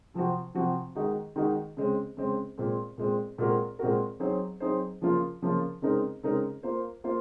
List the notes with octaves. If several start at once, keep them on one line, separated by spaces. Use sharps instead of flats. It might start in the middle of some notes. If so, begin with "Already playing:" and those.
C3 F3 C4 F#4
C3 F3 C4 F#4
D#3 G#3 D#4 F#4
D#3 G#3 D#4 F#4
C#3 G#3 C4
C#3 G#3 C4
A#2 G#3 C4
A#2 G#3 C4
A#2 G#3 C4 F#4 A#4
A#2 G#3 C4 F#4 A#4
F#3 C4 D#4 G#4 C5
F#3 C4 D#4 G#4 C5
C#3 F3 A#3 F4
C#3 F3 A#3 F4
C#3 G#3 C4 D#4 A#4
C#3 G#3 C4 D#4 A#4
A#3 F4 C5
A#3 F4 C5